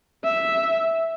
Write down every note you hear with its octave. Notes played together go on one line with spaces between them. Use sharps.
E5